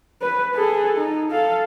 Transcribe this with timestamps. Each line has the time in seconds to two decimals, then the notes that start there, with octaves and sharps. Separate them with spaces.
0.22 B4
0.55 G#4 A4
0.98 D#4
1.31 A4 F5